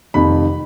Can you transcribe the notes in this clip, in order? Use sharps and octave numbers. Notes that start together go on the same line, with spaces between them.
F1 F2 D#3 B5